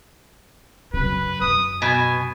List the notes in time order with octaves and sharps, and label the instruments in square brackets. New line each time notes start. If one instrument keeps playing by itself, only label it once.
[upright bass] F#2 C#3 [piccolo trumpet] B4
[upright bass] F#2 [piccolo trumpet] D#6
[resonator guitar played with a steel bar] B2 [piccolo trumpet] G#5